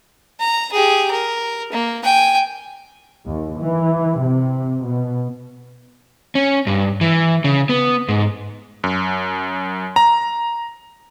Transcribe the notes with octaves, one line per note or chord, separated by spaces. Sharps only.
A#5
G4 G#4
A#4
A#3
G5 G#5
D#2
E3
C3
B2
C#4
G2
E3
C#3
B3
G#2
F#2
A#5